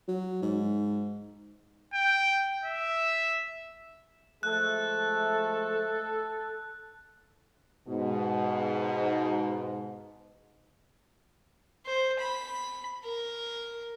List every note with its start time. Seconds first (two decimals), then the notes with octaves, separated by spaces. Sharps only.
0.08 F#3
0.42 G#2
1.94 G5
2.64 E5
4.43 F3 G#3 A3 A4 F#6
7.88 G#2 B2
11.86 C5
12.20 B5
13.05 A#4